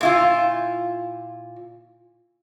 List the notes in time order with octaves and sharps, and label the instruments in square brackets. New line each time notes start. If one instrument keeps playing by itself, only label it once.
[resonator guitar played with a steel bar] A#2 E4 F4